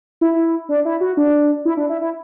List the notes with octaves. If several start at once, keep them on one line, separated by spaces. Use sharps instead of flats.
E4
D4
E4
F#4
D4
E4
D4
E4
E4